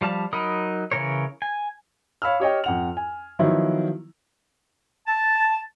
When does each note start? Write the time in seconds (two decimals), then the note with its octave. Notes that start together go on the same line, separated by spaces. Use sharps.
0.01 F3 G3 F5 A5
0.33 F#3 D#4 A#4 B5 D#6
0.91 C#3 E3 F3 A#4 C#5
1.42 G#5
2.22 C#5 F5 B5 E6 F6
2.40 G4 C#5 D#5 G5
2.64 F2 F#5 F7
2.97 G#5
3.39 D#3 F3 F#3 B3 E4
5.06 A5